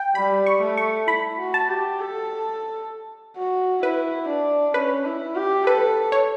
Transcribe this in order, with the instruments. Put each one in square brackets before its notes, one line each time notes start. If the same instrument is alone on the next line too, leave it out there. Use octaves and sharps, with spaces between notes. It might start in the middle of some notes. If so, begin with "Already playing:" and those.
Already playing: [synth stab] G5
[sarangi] G3 [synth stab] B5
[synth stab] C#6
[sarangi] A3
[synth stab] C#6
[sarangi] E4 [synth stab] B5
[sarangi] F#4
[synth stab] A5
[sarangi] G4
A4
F#4
[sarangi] E4 [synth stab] B4
[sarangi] D4
[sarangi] C#4 [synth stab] B4
[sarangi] E4
G4
[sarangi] A4 [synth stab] B4
[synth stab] C#5